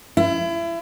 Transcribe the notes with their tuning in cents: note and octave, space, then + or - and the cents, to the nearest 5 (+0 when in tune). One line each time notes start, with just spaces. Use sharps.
E4 +30